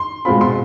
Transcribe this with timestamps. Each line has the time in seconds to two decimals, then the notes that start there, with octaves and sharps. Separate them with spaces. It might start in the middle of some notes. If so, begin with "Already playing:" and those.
Already playing: C6
0.25 B2 G#3 C4 F4 B5
0.41 C6